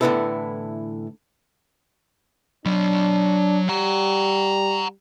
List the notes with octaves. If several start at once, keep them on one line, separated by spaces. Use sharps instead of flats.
A2 D3 E3 B3 E4 A4
F#3 D4 B5
G3 F#5 A#5